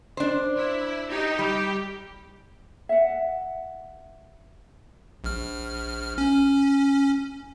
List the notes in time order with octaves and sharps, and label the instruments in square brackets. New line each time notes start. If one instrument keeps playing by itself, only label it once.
[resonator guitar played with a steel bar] D4 C5
[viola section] E4
D#4 G4
[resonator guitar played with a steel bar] G3 [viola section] G4
[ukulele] E5 F#5
[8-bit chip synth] A#1 F6
C#4